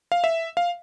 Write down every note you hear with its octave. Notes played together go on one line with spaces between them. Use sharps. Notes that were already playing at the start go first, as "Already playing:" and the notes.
F5
E5
F5